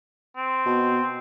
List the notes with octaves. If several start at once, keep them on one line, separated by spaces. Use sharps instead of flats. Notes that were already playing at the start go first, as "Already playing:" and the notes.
C4
B2